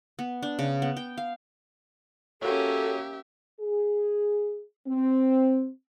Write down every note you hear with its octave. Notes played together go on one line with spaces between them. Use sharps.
B3
D4
C#3
B3
G5
F5
A#3 C#4 F#4 G4 A4 C#5 E5
G#4
C4